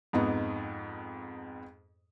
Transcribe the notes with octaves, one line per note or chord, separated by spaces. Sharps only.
F2 G#2 B3 D#4